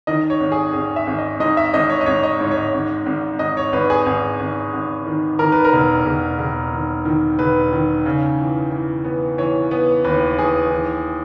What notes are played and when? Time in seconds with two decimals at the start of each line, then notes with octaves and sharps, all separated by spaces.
0.07 D#3 D#5
0.30 C#5
0.40 G#1
0.52 G#4
0.73 G#1 G#4
0.96 E5
1.07 G#1
1.18 D#5
1.40 G#2 D#5
1.57 E5
1.74 G#1 D#5
1.90 C#5
2.01 D#5
2.06 G#1 C#5
2.23 D#5
2.40 G#2 C#5
2.51 C#5
2.57 D#5
2.74 G#1
3.06 G#1
3.39 G#1 D#5
3.57 C#5
3.73 G#1 B4
3.90 G#4
4.06 G#1 G#4
4.40 G#1
4.73 G#1
5.07 D#3
5.39 D#3 A#4
5.52 B4
5.64 A#4
5.73 E1
6.06 E1
6.39 E1
6.73 D#3
7.05 D#3
7.39 E1 B4
7.73 D#3
8.06 C#3
8.39 E3
8.72 E3
9.04 B3
9.38 E3 C#5
9.71 B3
10.05 D#2 B4
10.37 E3 G#4
10.71 E3